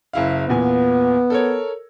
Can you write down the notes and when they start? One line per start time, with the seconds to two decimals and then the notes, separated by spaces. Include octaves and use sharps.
0.13 F#1 E4 F5
0.49 E2 A#2 B3 G#5
1.30 A4 A#4 C#5